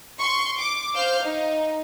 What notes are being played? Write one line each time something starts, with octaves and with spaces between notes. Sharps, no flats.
C6 C#6
D6
C5 F5 F6 G6
D#4